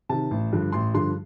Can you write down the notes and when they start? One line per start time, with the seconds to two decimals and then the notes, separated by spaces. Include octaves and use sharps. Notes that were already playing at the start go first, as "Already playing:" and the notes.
0.09 C3 D#3 A5
0.31 A1
0.53 G2 D3 F3
0.72 A1 C6
0.94 G2 D3 F3 C6